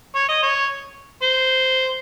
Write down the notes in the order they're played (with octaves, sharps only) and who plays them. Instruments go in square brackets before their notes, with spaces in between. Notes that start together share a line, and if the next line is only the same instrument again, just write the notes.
[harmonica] C#5
D#5
C#5
C5